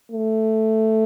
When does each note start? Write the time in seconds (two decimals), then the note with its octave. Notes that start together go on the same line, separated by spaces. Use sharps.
0.11 A3